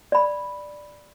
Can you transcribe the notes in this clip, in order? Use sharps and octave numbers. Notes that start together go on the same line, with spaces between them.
D5 B5